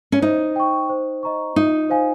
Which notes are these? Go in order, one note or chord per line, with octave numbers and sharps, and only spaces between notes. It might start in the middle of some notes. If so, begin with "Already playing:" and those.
C#4
D#4 C5
G5 C#6
C5
D#5 A#5 C#6
D#4 F4
C5 F5 G#5